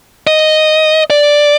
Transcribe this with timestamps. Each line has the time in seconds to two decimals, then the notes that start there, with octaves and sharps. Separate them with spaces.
0.27 D#5
1.10 D5